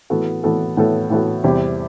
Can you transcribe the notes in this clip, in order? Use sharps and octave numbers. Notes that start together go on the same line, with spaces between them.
A2 E3 B3 F#4 A4
A2 E3 B3 F#4 A4
A2 E3 B3 F#4 A4
A2 E3 B3 F#4 A4
E2 C3 G3 C4 G4